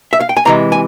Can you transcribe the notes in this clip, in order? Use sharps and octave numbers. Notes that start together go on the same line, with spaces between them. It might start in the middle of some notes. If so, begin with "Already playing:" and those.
E5
F5
G5
G#5
C3 E3 G#3 A#5
G#5